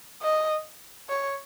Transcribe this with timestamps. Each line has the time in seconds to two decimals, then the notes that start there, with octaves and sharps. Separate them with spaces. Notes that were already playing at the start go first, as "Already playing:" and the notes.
0.22 D#5
1.10 C#5